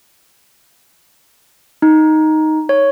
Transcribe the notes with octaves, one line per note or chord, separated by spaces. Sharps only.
D#4
C#5